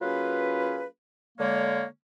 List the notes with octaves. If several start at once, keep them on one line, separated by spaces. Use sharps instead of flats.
F#3 A#3 C#4 F4 G#4 B4
D3 G#3 A#3 C#5